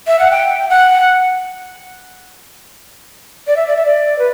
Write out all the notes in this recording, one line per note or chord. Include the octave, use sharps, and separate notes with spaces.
E5
F#5
G5
F#5
D5
E5
D5
E5
D5
B4